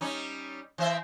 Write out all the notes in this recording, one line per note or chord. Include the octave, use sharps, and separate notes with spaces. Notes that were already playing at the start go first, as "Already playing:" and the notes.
G3 C#4 D#4
E3 C5 E5